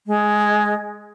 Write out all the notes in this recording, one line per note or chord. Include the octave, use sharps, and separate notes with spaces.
G#3